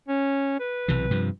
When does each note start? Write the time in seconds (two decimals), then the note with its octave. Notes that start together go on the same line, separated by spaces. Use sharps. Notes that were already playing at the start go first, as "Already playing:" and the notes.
0.08 C#4
0.60 B4
0.88 B1 C3 E3
1.11 G2 C3 F3